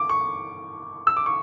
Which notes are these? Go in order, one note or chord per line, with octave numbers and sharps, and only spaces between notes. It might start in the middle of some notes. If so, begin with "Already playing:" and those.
Already playing: D6
C#6
E6
D6
C#6